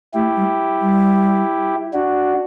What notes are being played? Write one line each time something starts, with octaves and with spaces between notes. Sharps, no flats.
A3 E4 G4
G3
G3
D4 F#4